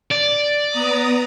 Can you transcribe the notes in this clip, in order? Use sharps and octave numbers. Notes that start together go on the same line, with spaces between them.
D5
B3 A#5 D#6